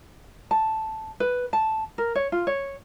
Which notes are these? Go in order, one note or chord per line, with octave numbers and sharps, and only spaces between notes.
A5
B4
A5
A#4
C#5
F4
C#5